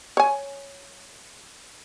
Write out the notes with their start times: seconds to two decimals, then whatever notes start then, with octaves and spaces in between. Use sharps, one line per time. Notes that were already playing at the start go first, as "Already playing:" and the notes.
0.17 C#5 G#5